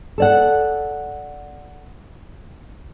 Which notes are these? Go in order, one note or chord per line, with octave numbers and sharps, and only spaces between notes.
A4 D5 F#5